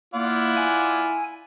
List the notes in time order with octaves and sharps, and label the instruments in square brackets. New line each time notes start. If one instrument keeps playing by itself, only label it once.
[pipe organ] A#3 [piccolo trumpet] E4 [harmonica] F4 D5 F#5
[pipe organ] G#5